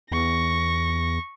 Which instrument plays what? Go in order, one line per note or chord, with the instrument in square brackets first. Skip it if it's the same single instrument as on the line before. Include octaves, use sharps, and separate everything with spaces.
[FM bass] E2 [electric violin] C#6 A#6